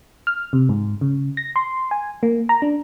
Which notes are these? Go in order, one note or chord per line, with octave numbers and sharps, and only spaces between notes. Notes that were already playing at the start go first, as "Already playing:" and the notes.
F6
C3
G#2
C#3
A#6
C6
G#5
A#3
A#5
D4